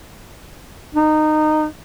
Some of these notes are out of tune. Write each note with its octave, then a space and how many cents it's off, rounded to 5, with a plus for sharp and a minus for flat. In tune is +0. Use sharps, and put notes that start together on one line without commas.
D#4 -20